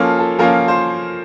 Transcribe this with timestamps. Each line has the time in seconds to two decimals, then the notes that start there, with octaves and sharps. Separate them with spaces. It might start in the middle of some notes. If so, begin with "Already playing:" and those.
Already playing: F3 A#3 C#4 F4 A4
0.19 A4
0.39 F3 A#3 C#4 F4 A#4
0.68 C5